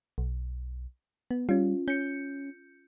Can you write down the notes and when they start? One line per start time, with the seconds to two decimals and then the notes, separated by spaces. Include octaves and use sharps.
0.18 B1
1.31 B3
1.49 G3 C#4 F4
1.88 C#4 G6 C#7